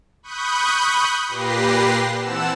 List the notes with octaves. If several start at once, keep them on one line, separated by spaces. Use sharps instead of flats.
B5 C#6 D#6 F#6 G6
A#2 G4 B4 A#6 C7
E3 C4 F#5 A5 E6 E7